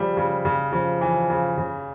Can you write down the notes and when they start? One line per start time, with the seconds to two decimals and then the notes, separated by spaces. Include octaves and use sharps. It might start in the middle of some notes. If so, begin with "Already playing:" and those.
Already playing: C#3 F3 G3
0.17 C#3
0.45 C#3
0.73 C#3 F3
1.01 E3
1.30 C#3
1.58 C#3